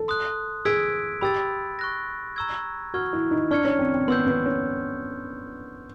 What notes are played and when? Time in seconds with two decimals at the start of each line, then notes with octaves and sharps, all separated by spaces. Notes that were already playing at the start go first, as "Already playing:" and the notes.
Already playing: A4
0.08 C6 D#6 F#6
0.65 G#4 E6 G#6 B6 D7
1.21 G4 B5 E6 A6
1.79 C#6 F#6 A#6
2.36 A#5 C#6 E6 G#6
2.94 F#4 C#6 F6 G#6
3.13 E4
3.31 D#4
3.51 D4 C#6 F6 G#6 C#7
3.65 C#4
3.79 C4
3.94 C4
4.08 B3 C6 E6 G6
4.27 B3
4.46 C#4